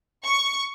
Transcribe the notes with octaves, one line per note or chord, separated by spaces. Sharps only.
C#6